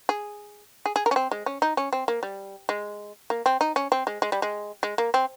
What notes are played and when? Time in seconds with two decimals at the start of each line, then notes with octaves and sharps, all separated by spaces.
0.09 G#4
0.86 G#4
0.96 G#4
1.06 A#4
1.11 C#4
1.16 C4
1.31 G#3
1.46 C#4
1.62 D#4
1.77 C#4
1.93 C4
2.08 A#3
2.23 G3
2.69 G#3
3.30 A#3
3.46 C4
3.61 D#4
3.76 C#4
3.92 C4
4.07 G#3
4.22 G#3
4.32 G3
4.42 G#3
4.83 G#3
4.98 A#3
5.14 C4